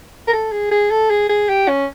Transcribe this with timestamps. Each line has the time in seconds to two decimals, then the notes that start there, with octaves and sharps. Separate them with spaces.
0.28 A#4
0.33 A4
0.52 G#4
0.71 G#4
0.91 A4
1.10 G#4
1.29 G#4
1.49 G4
1.68 C#4